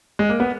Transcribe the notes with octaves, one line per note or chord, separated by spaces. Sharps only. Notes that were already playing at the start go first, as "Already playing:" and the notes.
G#3
A#3
B3